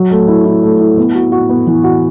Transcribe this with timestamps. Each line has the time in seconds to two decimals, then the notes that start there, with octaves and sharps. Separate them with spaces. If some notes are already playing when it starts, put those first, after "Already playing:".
Already playing: F#3
0.11 A3
0.28 E4
0.45 E4
0.63 A3
0.80 E4
0.97 B3
1.15 F#4
1.32 F#4
1.49 B3
1.67 E3
1.84 F#4